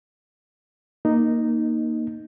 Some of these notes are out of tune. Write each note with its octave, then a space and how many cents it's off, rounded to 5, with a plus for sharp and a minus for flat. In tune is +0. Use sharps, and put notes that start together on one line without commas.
A#3 +5 D#4 -5